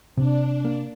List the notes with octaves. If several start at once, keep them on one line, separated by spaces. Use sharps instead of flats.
C3 D4
A#3